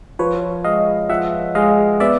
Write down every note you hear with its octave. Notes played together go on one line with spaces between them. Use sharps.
F3 B4 C#5
G#3 D#5 F5
F3 E5 F#5
G#3 D#5 F5
B3 D5 E5